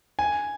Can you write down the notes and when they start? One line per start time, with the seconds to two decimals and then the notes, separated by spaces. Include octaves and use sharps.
0.19 G#5